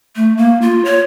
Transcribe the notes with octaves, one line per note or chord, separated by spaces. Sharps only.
A3
A#3
F4
C#5